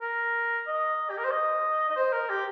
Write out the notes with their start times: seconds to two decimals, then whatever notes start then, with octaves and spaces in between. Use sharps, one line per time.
0.02 A#4
0.67 D#5
1.10 G4
1.18 A#4
1.24 C5
1.31 D#5
1.89 D#5
1.96 C5
2.13 A#4
2.30 G4